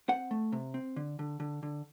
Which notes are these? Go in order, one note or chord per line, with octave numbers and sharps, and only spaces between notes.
C4 F#5
A3
C3
C4
D3
D3
D3
D3